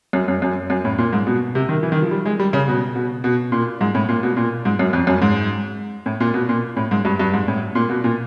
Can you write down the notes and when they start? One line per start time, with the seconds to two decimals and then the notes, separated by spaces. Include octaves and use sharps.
0.13 F#2
0.28 F#2
0.42 F#2
0.70 F#2
0.85 A2
0.98 A#2
1.13 G#2
1.27 B2
1.55 C3
1.69 D#3
1.83 E3
1.92 D#3
2.02 F3
2.11 G3
2.26 G#3
2.39 G3
2.53 C#3
2.68 B2
2.96 B2
3.24 B2
3.52 A#2
3.81 G#2
3.95 A2
4.09 A#2
4.23 B2
4.37 A#2
4.65 G#2
4.79 F#2
4.93 F2
5.07 F#2
5.22 G#2
6.06 A2
6.20 A#2
6.34 B2
6.49 A#2
6.76 A2
6.91 G#2
7.05 G2
7.19 G2
7.33 G#2
7.48 A2
7.75 A#2
7.90 B2
8.04 A#2